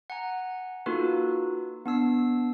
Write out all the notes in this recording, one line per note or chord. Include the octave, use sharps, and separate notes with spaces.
F#5 G#5 A#5
A#3 D#4 F4 F#4 A4 B4
B3 D4 E6 C7